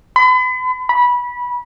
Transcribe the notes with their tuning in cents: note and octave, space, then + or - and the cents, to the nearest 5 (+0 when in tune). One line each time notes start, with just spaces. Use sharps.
B5 +40
B5 -20